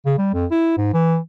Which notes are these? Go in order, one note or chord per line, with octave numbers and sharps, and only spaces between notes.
C#3
G3
F2
E4
G#2
E3